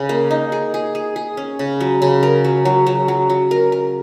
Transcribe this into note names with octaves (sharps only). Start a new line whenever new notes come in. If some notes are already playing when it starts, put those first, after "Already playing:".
Already playing: C#3
A#3
D#4
G#4
G#4
G#4
G#4
C#4
C#3
F#3
C#3
A#4
F#3
F#3
F#3
F#3
F#3
A#4
A#4